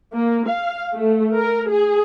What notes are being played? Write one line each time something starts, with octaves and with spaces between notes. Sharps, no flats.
A#3
F5
A3
A#4
G#4